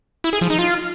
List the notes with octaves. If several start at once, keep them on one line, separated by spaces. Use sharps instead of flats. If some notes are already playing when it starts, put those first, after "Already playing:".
E4
G#4
F3
D#4
F4